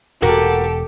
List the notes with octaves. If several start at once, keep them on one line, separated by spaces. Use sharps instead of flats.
E1 A#3 F#4 G4 A4